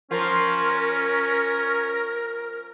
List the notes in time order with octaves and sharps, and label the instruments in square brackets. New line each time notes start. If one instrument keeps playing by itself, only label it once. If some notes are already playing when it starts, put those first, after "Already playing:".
[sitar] F3 F4 [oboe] C#4 [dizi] A#4